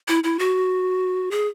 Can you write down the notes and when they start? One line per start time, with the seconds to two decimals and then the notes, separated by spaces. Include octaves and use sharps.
0.08 E4
0.24 E4
0.39 F#4
1.31 G#4